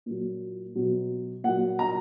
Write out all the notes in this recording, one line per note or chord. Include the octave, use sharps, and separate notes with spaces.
A#2 F#3
B2 F#3
A#2 F#3 F#5
A#5